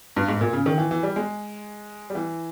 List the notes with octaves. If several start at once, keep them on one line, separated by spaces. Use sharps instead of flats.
G2
G#2
A#2
C#3
D#3
E3
E3
G3
G#3
G3
E3